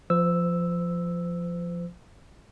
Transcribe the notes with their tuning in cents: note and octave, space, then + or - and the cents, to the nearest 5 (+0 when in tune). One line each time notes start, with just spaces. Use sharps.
F3 +0 C5 -35 E6 +0